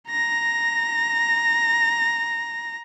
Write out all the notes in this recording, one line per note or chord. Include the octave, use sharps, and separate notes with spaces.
A#5 A#6